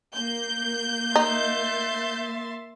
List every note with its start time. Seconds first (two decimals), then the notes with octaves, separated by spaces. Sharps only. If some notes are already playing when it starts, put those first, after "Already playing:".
0.15 A#3 G6
1.16 D#4 E5 C6 A6